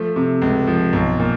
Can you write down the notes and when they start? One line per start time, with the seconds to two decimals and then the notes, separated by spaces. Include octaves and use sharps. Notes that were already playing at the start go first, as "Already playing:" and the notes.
Already playing: F3 A3
0.16 C3
0.42 C#2
0.67 F3
0.93 B1
1.19 A#2